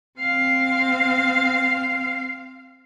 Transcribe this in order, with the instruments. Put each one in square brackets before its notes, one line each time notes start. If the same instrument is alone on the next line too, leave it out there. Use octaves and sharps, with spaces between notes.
[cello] C4 F5